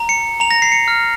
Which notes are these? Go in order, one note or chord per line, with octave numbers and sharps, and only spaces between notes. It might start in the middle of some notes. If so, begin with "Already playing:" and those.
Already playing: A#5
C#7
A#5 F7
A#6
C7
C#7
F6